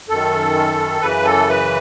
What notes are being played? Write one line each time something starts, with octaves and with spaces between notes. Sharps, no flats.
F#2 D#3 A4
F#2 C#3 E3 B4
A4
B4